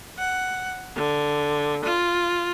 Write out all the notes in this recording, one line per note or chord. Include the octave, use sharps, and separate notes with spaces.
F#5
D3
F4